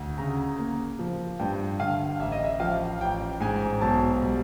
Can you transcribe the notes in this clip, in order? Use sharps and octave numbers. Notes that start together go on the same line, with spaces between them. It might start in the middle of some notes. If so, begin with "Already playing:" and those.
Already playing: D2
C#3 A#5
A#3
F3
G2 G5
D3 F5
A1 E5
D#5
E5
F3 F5
A1 G5
G#2 G#5
B1 A5
G3